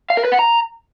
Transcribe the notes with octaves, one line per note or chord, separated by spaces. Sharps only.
F5
A#4
B4
F#5
A#5